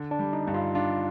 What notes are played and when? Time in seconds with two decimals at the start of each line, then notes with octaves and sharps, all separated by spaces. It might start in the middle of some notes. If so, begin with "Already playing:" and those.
Already playing: D3
0.11 D4
0.19 G3
0.33 D#4
0.47 G2
0.54 F4
0.75 D4 F4